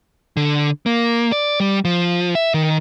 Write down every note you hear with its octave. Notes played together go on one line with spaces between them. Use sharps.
D3
A#3
D5
G3
F3
E5
D#3